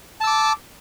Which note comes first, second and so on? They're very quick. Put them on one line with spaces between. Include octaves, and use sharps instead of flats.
A5 E6 D6